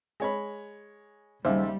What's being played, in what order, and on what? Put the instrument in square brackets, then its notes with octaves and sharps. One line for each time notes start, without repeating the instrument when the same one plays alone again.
[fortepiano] G#3 C#5 B5
[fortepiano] D#2 C#3 [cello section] G3 [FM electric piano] C5 E5